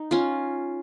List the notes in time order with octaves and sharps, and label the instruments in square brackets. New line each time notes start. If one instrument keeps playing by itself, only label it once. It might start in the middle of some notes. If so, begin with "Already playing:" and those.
Already playing: [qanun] D#4
C#4 F4